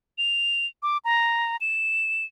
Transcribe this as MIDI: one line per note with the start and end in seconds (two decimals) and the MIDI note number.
0.18 0.66 101
0.83 0.98 86
1.05 1.57 82
1.61 2.24 100